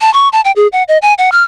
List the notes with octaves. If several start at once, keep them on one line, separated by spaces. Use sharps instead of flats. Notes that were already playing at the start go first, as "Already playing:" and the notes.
A5
C#6
A5
G5
G#4
F#5
D#5
G#5
F#5
F6